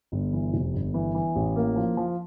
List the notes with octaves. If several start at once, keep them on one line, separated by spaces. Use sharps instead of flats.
G1
E3
F1
G1
E3
E3
A1
A#3
F3
F3